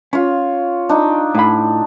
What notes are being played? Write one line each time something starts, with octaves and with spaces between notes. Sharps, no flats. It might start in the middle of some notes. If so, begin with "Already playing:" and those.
C#4 F4 C#5
D4 D#4
A2 B5